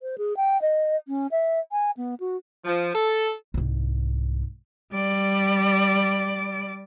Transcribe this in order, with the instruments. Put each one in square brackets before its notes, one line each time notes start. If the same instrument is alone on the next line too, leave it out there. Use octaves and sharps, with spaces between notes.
[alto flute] C5
G#4
G5
D#5
C#4
E5
G#5
B3
F#4
[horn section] F3
A4
[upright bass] C2 G#2
[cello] G3 D5